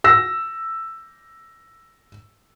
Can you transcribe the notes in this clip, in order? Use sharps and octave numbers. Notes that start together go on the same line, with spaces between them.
E6 A#6